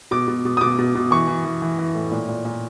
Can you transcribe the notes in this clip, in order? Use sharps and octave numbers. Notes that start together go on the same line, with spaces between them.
B2 D6
B2
B2
D#6
B2 D6
B2
B2
E3 C#6
E3
E3
E3
E3
A2
A#2
A#2
A#2